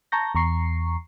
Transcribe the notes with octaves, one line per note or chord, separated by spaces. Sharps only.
A5 A#5 C#6 G6 A#6
E2 A#5 C#6 C7